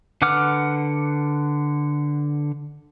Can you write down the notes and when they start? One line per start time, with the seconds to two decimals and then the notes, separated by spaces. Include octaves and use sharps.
0.22 D3 B4 F#5 D6 F6